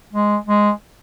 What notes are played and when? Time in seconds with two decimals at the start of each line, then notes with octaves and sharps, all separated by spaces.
0.13 G#3
0.47 G#3